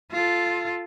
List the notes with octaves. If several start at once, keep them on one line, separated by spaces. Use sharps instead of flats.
F4 A4